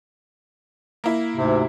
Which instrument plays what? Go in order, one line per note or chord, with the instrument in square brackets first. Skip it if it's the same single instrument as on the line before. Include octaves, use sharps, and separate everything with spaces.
[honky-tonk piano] A#3 E4
[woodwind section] D2 G#2 C3